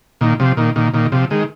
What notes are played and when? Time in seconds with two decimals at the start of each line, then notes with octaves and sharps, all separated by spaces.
0.21 A#2 D#3
0.40 C3 F3
0.57 A#2 D#3
0.76 A#2 D#3
0.94 A#2 D#3
1.12 C3 F3
1.31 D#3 G#3